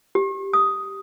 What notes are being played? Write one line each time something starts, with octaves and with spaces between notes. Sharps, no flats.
G4
D#6